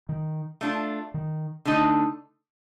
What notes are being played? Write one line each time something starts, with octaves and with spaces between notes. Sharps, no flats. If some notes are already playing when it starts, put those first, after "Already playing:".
D#3
A3 D4 F4
D#3
D3 A3 D#4